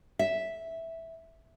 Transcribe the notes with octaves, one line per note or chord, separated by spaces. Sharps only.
E5